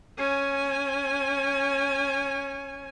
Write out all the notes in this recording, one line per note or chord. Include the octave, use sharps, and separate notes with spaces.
C#4 G#5